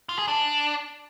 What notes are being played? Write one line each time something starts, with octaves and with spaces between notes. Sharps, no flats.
F4
G#4
D4